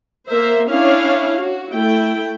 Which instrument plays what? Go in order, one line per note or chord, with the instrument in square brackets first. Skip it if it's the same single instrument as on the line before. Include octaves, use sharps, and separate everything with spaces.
[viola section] A#3 A#4 C5 E5
C#4 D4 E4 C#5 F5
F#4
A3 E4 G5